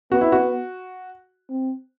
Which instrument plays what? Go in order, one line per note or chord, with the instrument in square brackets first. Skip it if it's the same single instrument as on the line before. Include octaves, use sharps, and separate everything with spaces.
[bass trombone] B3 [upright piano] F#4
[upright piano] E4
F#4
[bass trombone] C4